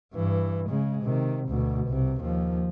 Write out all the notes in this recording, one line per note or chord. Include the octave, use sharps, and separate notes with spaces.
G2 E3
C#3 G#3
C3 D#3
D2 B2
C2 C3
D#2 F3